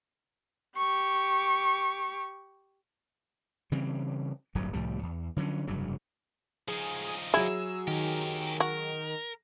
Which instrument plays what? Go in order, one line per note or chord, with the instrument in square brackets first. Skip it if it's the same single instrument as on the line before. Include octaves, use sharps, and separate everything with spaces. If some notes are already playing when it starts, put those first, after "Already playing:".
[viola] G4 C#6
[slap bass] C#3 E3 G3 C4
D1 G1 G2 F#3
C2 A2 F3 G3
E2
D3 F3 F#3 C#4
F1 G2 C#3 F#3
[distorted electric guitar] F3 D#4 [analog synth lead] G#4
[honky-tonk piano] F#3 G#4 [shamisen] E4 [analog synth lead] E6
[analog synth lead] D#3 [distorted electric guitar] G4 A#4
[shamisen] F#4 [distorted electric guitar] A#4